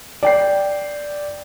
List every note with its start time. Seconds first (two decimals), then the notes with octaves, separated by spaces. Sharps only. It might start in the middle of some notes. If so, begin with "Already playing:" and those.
0.23 D5 G5 C7